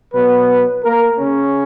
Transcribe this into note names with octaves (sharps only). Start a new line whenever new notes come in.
B2 F#3 B3 B4
A#3 A#4
C#3 C#4